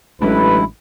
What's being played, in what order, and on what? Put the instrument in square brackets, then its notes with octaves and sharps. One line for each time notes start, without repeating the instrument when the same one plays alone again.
[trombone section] A1 [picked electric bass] F#3 G#3 D4 [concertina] E4 [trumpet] B4